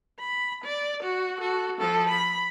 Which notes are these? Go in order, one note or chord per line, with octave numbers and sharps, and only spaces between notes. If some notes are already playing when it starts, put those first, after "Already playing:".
B5
D5
F#4
F#4 A4
F3 A4
B5